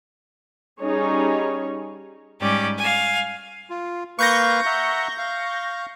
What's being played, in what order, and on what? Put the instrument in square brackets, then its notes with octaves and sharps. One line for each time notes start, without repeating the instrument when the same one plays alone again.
[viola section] G3 C#4 D#4 G#4 C#5
[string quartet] G#2 G3 C#4 G4 D5
F5 G#5
[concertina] F4
[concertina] A#3 B4 F5 [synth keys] C#6 G6 A#6
[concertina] E5 F#5 A#5
F5